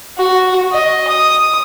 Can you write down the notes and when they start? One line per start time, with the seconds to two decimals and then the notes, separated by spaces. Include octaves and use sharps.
0.18 F#4
0.72 D#5
1.08 D#6